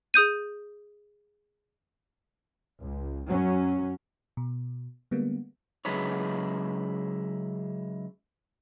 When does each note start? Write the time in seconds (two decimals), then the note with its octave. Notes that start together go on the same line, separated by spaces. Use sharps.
0.14 G#4 D#6 G6 D#7
2.81 C#2
3.28 F#2 F#3 C#4
4.37 B2
5.11 D3 G3 G#3 A#3 B3
5.85 C#3 F#3 G#3 E4 B4 C#5